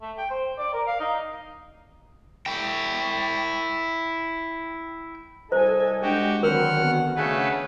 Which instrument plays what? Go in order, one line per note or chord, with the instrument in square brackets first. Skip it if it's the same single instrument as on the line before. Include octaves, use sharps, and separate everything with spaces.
[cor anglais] A3
G5
C5
D5
A#4
F5
D#4
[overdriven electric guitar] E4 G5
[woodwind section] C2 G3 D#5 [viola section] A4 G#5 [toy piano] C5
[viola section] G#3 D4 G5 [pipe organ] F#4 G4
[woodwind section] D3 D#3 [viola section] F#3 C4 B4 [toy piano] A#4 [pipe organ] F#5 F6
[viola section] B3 F#4
[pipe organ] C#3 A3 B4 [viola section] D4 C#5 [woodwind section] G#4 F#5